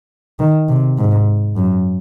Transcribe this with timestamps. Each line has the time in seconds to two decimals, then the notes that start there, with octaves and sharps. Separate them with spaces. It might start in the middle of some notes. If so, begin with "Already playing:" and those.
0.39 D#3
0.68 C3
0.98 G#2
1.56 F#2